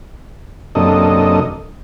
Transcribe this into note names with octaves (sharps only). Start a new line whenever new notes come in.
F#2 C3 A#3 D4 A4 D#5